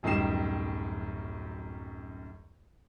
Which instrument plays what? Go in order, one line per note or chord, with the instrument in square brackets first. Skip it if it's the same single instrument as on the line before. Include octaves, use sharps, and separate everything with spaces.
[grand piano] D1 F#2 D#3 G3 C7 E7